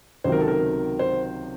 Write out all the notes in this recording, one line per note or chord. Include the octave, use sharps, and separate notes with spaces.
C#2 C3 D#3 F#3 C5
A#4
A4
A#4
C5